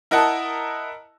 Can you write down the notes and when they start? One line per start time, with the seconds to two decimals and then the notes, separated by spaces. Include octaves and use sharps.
0.11 E4 A#4 D#5 F#5 A5